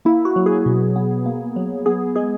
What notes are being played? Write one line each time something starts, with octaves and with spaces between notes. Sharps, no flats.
A#3 E4
F#4
F#3
G#4
B2
B3
A#3
F#3
B3 G#4
G#3 G#4